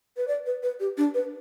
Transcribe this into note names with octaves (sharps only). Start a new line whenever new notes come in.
B4
D5
B4
B4
G4
D4
B4